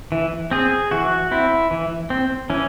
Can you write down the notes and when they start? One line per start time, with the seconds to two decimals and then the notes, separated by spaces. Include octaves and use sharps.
0.12 E3
0.51 C4 G#4
0.91 E3 F#4
1.31 C4 E4
1.71 E3
2.10 C4
2.50 E3 C#4